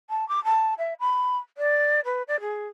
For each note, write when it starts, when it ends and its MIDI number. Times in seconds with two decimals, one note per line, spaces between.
0.10 0.27 81
0.29 0.43 86
0.44 0.74 81
0.78 0.94 76
1.00 1.37 83
1.58 2.00 74
2.05 2.22 71
2.28 2.40 74
2.41 2.68 68